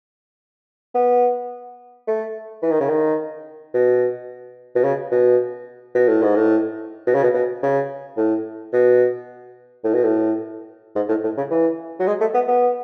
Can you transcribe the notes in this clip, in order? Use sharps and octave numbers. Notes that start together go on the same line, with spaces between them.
B3
A3
E3
D#3
C#3
D#3
B2
B2
C#3
B2
B2
A2
G#2
A2
B2
C#3
B2
B2
C#3
A2
B2
A2
B2
A2
G#2
A2
A2
C#3
E3
F#3
G#3
A3
B3
B3